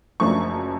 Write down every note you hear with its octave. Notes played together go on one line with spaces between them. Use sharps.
F#1 F#2 F3 A3 D4 C#6